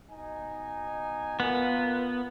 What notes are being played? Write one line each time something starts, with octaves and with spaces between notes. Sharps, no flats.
B2 D#4 G#5
B3 F4 A#4